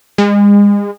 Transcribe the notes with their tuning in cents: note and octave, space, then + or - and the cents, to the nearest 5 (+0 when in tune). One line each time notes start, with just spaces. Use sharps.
G#3 -35